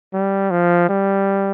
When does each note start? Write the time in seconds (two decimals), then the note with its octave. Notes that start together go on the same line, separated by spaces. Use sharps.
0.14 G3
0.51 F3
0.89 G3